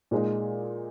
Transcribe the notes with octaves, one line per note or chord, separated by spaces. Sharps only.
A#2 G#3 D#4